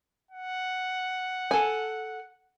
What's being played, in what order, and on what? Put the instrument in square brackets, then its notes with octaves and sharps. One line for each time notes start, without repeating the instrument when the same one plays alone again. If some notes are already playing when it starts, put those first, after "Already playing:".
[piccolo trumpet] F#5
[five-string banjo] A4 G#5